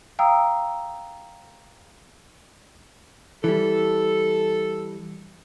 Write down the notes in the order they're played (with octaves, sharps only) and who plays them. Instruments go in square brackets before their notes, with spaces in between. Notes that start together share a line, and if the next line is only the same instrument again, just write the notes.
[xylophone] F5 G5 A#5 D#6 E6
[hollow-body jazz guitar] E3 G3 [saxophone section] A4